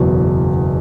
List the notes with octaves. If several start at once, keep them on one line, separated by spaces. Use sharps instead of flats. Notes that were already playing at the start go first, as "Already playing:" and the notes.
Already playing: F#1 E2 B2 F#3